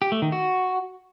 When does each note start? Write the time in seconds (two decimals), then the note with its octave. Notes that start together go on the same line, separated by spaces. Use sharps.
0.02 G4
0.12 A3
0.22 D#3
0.32 F#4